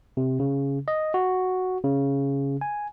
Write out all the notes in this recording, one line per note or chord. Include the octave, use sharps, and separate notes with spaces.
C3
C#3
D#5
F#4
C#3
G#5